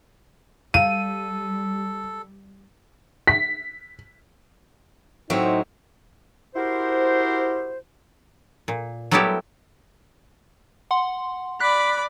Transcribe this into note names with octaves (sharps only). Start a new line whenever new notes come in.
G3 A4 F5 D#7
B6
A2 F#3 C4 D#4 E5
E4 F#4 G4 A#4 C5
A#2
F#3 G3 A3 B3 E4 G4
F#5 C6
D5 B5 F#6 B6